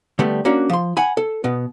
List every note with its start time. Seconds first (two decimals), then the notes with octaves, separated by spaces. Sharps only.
0.19 D3 G3 A3 B3
0.45 A#3 C#4 D4 F#4
0.70 F3 C6
0.97 F#5 G#5 B5
1.17 A4
1.44 B2 B3